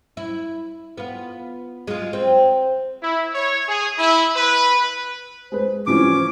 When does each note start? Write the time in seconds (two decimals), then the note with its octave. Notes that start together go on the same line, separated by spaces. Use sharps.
0.17 E4
0.97 B3 F4
1.87 G#3 F4
2.13 C4
3.03 E4
3.34 C#5
3.68 G#4
3.98 E4
4.36 B4
5.52 G#3 B4 C5
5.87 C3 E3 F3 C#4 C5 D6